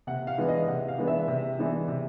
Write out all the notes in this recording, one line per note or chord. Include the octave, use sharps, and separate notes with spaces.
C3 F#5
F5
E3 G#3 B3 D4
D#5
C3 F#5
F5
E3 G#3 B3 D4
E5
C3
E3 G#3 B3 D4
C3